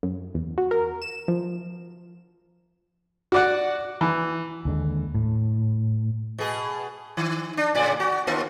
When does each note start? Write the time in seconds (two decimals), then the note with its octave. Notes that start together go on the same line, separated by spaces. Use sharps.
0.03 F#2
0.34 E2
0.58 F#4
0.71 A#4
1.02 E7
1.28 F3
3.32 F#4 D5 F#5
4.01 E3
4.65 D#2 D3 G#3
5.15 A2
6.38 B2 G#4
7.17 D#3
7.57 D4
7.75 A2 C#3 D5
8.00 F#4
8.27 D#2 A#3 F4